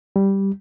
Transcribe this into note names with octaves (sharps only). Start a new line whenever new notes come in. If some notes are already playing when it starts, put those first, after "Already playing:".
G3